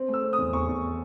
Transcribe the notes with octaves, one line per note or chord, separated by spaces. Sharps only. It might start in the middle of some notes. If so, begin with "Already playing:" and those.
Already playing: C4
A3
E6
C4
D#6
E2
E2 C#6
E2